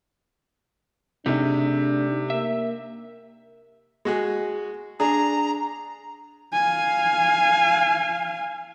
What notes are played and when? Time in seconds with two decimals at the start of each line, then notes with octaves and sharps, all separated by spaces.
1.26 C3 A3 D4 D#4 G#4
2.30 A#3 E5
4.05 G#3 F#4 G#4
5.00 D4 G#4 A#5
6.54 F5 G#5